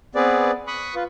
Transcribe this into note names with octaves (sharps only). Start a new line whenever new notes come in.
B3 C4 G#4 B4 D5
B5 C#6 D#6 F#6
F4 B4